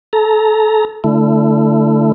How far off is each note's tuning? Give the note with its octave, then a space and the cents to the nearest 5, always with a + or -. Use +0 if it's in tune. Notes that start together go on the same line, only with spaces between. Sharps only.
A4 -25 A#5 +0
D3 +0 A3 +0 E4 +25